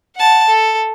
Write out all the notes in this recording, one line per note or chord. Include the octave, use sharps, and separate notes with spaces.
F#5 A5
A4